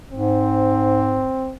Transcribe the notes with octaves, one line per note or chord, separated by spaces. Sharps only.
G#2 C4